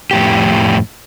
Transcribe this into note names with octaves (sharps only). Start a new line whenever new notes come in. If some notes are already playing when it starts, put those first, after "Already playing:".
F2 A2 G4